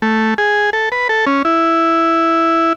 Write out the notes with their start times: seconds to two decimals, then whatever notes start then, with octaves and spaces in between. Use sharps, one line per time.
0.02 A3
0.38 G#4
0.73 A4
0.92 B4
1.09 A4
1.26 C#4
1.45 E4